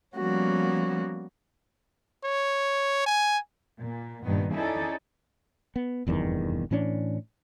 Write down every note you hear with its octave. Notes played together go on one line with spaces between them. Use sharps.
F3 G3 A#3 B3 C#4 F#4
C#5
G#5
A#2
G2 A#2 D#3 B3
C#4 D#4 E4 G#4 A4 D5
B3
F1 E2 G2 D#3
A2 E3 C#4 D4